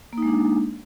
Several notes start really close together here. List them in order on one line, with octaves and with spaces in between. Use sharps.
A#3 D#4 G#3 D4